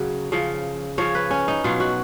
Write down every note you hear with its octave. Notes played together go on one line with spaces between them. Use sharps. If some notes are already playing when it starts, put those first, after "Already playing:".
Already playing: C#3 F#3
C#3 F3
C#3 F3 C#5
B4
C#4
D#4
B2 F#3 F4
F#4